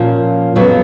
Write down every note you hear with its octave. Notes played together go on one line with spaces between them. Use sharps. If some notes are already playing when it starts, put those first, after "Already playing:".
Already playing: A#2 F3 A#3 C#4
F2 C#3 F#3 B3 F#4